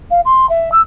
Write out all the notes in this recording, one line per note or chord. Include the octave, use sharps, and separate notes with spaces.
F5
C6
E5
E6